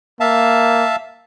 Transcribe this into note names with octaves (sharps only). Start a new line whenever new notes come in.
A#3 E5 F5 A5